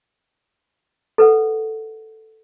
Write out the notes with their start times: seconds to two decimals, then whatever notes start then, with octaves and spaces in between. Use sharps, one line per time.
1.18 A4 B4 F#5